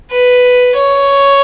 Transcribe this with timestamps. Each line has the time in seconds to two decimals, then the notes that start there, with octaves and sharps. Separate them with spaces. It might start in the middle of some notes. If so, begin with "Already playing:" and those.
0.12 B4
0.75 C#5